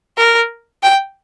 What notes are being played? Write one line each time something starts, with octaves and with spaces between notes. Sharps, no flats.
A#4
G5